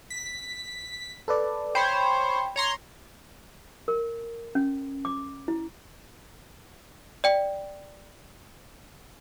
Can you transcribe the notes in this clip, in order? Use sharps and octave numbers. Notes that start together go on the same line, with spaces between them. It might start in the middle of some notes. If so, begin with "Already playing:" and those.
B6
A4 B4 D5
C5 C#5 G5 B5
C#5 A#5 C6
A#4
C#4
D6
E4
D5 G5